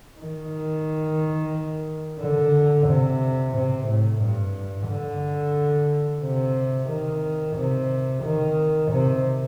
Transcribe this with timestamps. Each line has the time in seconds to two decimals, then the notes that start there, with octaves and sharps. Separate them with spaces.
0.20 D#3
2.20 D3
2.87 C3
3.55 C3
3.87 A2
4.22 G2
4.88 D3
6.23 C3
6.89 D#3
7.56 C3
8.23 D#3
8.91 C3